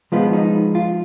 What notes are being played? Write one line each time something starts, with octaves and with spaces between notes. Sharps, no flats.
F3 G#3 B3 F4
D#4
F4